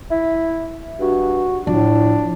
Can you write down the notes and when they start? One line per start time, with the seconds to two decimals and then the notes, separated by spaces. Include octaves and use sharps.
0.11 E4
1.00 G2 F#4
1.67 A2 F3 D4